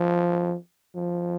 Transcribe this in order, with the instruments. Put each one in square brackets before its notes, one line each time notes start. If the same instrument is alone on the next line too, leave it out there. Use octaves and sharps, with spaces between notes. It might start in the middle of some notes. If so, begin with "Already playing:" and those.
Already playing: [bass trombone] F3
F3